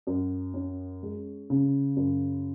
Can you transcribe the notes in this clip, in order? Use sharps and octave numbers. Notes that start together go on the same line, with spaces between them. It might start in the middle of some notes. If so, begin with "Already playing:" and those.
F#2
C#4
G#3
C#3
F#2